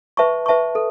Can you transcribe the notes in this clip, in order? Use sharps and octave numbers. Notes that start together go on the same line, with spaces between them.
B4 E5 A5 C#6
B4 E5 A5 C#6
A4